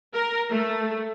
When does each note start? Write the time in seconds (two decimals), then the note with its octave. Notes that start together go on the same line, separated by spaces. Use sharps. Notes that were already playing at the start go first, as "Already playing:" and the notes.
0.13 A#4
0.49 A3